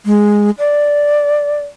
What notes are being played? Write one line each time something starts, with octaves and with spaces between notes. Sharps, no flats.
G#3
D5